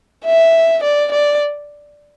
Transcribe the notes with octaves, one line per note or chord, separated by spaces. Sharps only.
E5
D5
D5